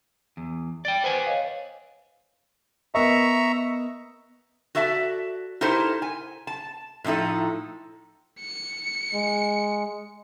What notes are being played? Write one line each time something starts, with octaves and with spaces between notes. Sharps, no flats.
E2
D5 G5 A6 G7
B4 C5 F#5 G#5
C#5 D#5 F5
B3 A#4 D#5 E5 A#5 C#6
F#4 A4 D5 E5 A5
D#4 E4 G4 A4 A#4 C5
G#5
A5
A2 F3 D#4 E4 A4
C#7
G#3